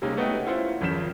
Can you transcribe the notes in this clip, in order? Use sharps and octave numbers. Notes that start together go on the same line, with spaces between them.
C3 G3 G#3 A#3 C#4 D#4
A3 B3 D#4 F#4 G5
C4 C#4 E4 F4 C5 F#5
G#1 F2 C#3 G6 B6 E7